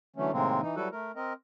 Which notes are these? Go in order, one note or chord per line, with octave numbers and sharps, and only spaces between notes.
D3 E3 F#3 A3 C#4
A2 C3 D#3 G#3 A#3 C4
E3 D#4
F#3 G3 E4 F#4 A4 B4
A3 A#4
C4 A#4 D#5